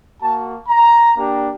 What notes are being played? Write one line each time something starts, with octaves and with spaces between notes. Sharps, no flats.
A#3 F#4 A5
A#5
A#3 D4 G4